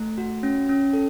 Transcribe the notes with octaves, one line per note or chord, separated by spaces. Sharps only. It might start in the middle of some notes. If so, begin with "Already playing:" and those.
Already playing: A3
F#4
C#4
C#4
A4